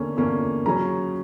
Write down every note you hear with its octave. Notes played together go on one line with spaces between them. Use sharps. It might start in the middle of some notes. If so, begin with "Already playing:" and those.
Already playing: E2 D3 A#3 C#4
E2 D3 A#3 C#4
C#3 F#3 C#4 A#5